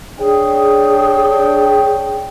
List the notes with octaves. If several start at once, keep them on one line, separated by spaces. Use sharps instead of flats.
D4 G#4 C#5 G5